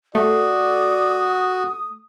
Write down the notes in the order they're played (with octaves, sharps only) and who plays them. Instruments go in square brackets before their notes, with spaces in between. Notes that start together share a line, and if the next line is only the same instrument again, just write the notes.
[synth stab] A3 [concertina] F#4 [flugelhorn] D5 [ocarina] D#6